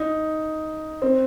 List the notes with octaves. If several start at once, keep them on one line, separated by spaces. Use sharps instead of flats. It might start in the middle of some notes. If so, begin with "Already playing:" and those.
Already playing: D#4
C4